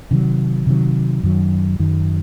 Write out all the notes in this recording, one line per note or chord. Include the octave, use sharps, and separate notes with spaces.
C3 D#3 F#3
C3 D#3 F#3
F#2 D#3 F#3
F#2 D#3 F#3